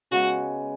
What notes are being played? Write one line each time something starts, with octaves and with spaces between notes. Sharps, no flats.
C#3 G#3 B3 F#4